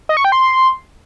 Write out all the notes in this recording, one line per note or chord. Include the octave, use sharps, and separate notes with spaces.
D#5
C#6
G5
C6